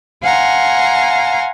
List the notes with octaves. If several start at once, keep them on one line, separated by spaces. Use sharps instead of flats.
F5 F#5 G#5 A#5 C6